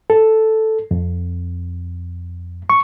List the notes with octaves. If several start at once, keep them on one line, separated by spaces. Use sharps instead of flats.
A4
F2
C#6